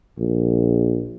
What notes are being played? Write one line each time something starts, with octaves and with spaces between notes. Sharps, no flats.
A#1